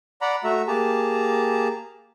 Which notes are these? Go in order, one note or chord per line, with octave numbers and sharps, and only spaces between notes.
D5 F#5 A#5 B5
A3 F#4 E5 A#5
A#3 G4 G#4 A5 A#5